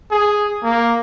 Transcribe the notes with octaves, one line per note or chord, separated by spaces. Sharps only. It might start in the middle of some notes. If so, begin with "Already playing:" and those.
G#4
A#3